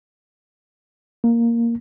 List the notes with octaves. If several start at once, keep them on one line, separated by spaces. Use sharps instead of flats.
A#3